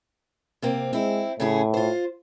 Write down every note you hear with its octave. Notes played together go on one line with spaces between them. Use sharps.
C3 A#3 C4
G#3 C4 E4
A2 C#3 C#4 G#4
F4 C5